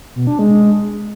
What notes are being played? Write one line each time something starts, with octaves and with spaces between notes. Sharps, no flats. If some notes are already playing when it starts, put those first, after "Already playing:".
B2
D4
G#3